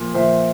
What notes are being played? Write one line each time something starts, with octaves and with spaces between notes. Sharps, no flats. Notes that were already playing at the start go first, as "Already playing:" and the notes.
Already playing: A#2 F3
A#2 F3 C5 E5